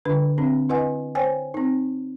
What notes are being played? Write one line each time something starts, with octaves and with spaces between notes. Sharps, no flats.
D3 D4 B4
C4 D4
E4 B4 D#5 F#5 G#5
C5 C#5 G5 G#5
C4 D#4